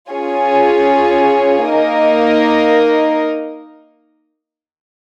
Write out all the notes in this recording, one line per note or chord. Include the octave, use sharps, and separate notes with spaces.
C#4 F4 G#4 C#5 G#5
A#3 D#4 A#4 D#5